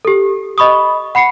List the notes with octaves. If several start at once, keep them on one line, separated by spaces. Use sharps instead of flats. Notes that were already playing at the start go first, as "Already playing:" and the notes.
G4 A4
D#5 B5 C#6 D#6
F#5 B5 C7 C#7